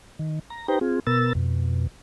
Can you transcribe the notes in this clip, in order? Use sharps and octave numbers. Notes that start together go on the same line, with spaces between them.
D#3
A#5
D#4 G4 B4 C5 G5 A#5
C4 F4 G#4
B2 B3 A#4 E6 A6
F2 B2